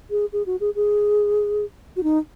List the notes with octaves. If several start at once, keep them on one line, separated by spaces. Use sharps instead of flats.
G#4
G#4
F#4
G#4
G#4
F#4
D#4